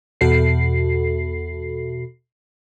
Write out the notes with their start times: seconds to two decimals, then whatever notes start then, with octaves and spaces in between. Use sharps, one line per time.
0.21 E2 B2 F#4 A4 C7